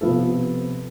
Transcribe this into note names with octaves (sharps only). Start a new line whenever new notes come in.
C3 F3 B3 F4 A4